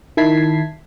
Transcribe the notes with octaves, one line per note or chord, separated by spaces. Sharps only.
D#3 E4 A5 G#6 B6 C7